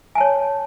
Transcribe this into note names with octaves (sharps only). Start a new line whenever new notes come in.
C#5 G#5 A5